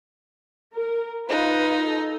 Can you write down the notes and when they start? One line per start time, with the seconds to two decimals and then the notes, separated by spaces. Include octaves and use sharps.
0.75 A#4
1.29 D#4 F4 B4
1.85 A4